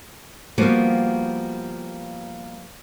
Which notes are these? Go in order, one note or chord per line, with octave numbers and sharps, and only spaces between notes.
F3 G3 A#3 B3 F#4 G4